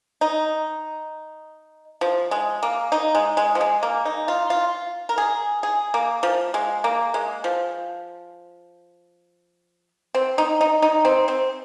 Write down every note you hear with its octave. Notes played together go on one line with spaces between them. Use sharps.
D#4
F3
G#3
A#3
D#4
G#3
G#3
F3
G#3
A#3
D#4
F4
F4
A#4
G#4
G#4
A#3
F3
G#3
A#3
G#3
F3
C4
D#4
D#4
D#4
C4
C4